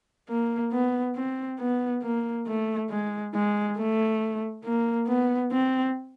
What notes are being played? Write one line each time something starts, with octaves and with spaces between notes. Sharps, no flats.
A#3
B3
C4
B3
A#3
A3
G#3
G#3
A3
A#3
B3
C4